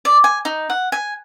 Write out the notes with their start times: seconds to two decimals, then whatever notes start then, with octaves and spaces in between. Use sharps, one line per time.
0.05 D5
0.24 G#5
0.45 D#4
0.70 F#5
0.92 G#5